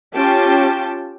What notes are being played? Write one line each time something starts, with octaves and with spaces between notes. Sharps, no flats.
C#4 F4 G4 G5 A5